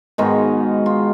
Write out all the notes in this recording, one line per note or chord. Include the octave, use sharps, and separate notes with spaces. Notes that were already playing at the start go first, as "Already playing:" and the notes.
G#2 D#3 G#3 B3 F#4
F4